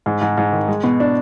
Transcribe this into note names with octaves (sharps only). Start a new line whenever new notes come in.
G#2
G#2
G#2
D#3
G#3
B2
D4